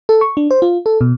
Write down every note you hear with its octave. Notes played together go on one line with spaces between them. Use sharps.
A4
C#6
D4
C5
F4
A4
B2